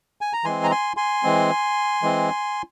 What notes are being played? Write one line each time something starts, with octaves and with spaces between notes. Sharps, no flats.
G#5
A#5
E3 G#3 C4 G#5 C6
A#5
G#5 C6
G#5 C6
E3 G#3 C4
E3 G#3 C4